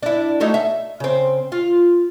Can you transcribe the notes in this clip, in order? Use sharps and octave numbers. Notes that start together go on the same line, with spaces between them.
D4 E4
F#3 A3 D#4
E5
C#3 C4
F4